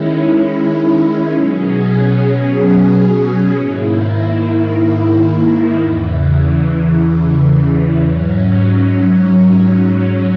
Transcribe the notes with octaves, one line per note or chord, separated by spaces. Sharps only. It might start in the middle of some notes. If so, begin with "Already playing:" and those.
Already playing: D#3 G#3 C#4 E4
B2 F#3 C#4 G#4
G#2 D#3 A#3 E4
E2 C#3 E3
G#2 F#3 C#4